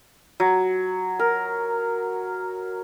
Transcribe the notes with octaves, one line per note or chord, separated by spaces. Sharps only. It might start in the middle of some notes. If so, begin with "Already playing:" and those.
F#3
A#4